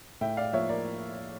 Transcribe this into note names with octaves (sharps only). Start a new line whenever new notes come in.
A2 E5 G5
D5 F5
F3 A#3 C#5 E5
A#4 D5